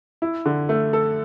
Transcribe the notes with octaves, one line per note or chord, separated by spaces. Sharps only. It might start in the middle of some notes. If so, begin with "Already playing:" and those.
E4
D3
A3
A4